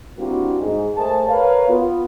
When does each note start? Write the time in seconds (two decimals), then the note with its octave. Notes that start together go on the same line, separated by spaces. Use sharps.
0.17 G3 A#3 C4 D4 E4 F#4
0.59 G#2
0.96 A3 G#4 A#4 C5 A5
1.28 A#4 B4 C#5 F5
1.68 B3 F4